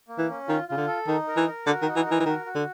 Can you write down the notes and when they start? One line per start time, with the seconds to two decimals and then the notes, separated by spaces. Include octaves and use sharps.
0.08 A#3
0.18 E3
0.29 C#4
0.48 D#3 F4
0.68 C#3 F4
0.77 D3
0.87 A4
1.07 D#3 D#4
1.28 A#4
1.37 E3
1.47 A#4
1.66 D3 F#4
1.82 D#3
1.86 D#4
1.96 E3
2.06 E3 A#4
2.20 E3
2.26 D#3 F#4
2.46 F#4
2.55 D3